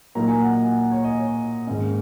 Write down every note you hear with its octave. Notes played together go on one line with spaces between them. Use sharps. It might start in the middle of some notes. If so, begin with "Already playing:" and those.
A#2 F#3 A#3 D#4 A#5
G#5
F#5
D#5
F#5
F#5
C#5
D#5
C#5
G#2 D#3 A#3 C#4 D#5